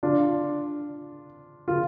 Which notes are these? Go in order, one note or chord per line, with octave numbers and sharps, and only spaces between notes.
D4 F4
F4